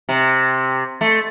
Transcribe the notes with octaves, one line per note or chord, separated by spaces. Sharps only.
C3
A3